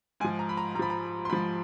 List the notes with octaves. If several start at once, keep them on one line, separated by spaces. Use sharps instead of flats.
G#2 F3 G#5
A#5
B5
A#5
G#2 F3 A#5 B5
A#5
C6
G#2 F3 B5